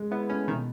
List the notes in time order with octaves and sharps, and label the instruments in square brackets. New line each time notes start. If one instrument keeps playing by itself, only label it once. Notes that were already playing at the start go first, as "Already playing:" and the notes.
Already playing: [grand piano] G#3
[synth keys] B3 [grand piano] E4
[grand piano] A3 [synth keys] C#4
[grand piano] B2 [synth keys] D#3